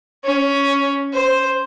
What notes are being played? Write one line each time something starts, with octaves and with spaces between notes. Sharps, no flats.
C#4
C5